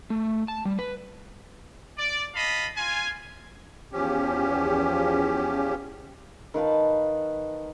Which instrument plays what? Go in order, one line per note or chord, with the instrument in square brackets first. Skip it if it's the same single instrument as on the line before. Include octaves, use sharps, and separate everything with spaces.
[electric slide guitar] A3
A5
G3
B4
[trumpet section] D5
D#5 F5 A5 B5
F4 G#5
[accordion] E2 F3 C#4 G4
[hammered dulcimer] D#3 B4 F5 A5